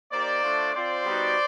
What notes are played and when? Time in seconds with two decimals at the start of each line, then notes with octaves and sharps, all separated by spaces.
0.11 A#3 D#4 G4 C5 D5
0.42 A3 D4 F4
0.74 C4 F4 C5 D5
1.05 G3 B3 D#4 F#4